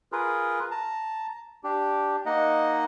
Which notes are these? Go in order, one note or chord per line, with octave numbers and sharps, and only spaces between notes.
F4 G#4 A#4 B4
A5 A#5
D4 G4
A#3 D#4 D#5 F#5